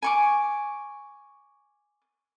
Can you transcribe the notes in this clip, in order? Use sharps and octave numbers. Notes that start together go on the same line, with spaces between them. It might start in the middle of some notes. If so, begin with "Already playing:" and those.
G#5 C#6 D6